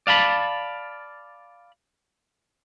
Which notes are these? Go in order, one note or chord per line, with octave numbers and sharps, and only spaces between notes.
D5 F5 A5 B5